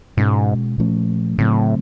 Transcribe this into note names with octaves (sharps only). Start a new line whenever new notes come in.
G#2 B2 G#3 C#4
A#2 F3 A3 C#4
A2 C#3 F#3 A3 C4